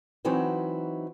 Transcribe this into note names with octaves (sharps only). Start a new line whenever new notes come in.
E3 F#3 C4 D#4 E4 F#4